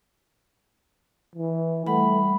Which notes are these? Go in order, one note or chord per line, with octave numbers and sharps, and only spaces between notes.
E3
G3 A3 F#5 B5